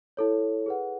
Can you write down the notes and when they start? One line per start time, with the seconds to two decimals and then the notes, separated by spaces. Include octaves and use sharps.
0.17 E4 A4 C#5
0.66 G#4 B4 F#5